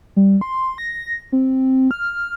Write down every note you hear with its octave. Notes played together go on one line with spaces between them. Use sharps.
G3
C6
A#6
C4
F6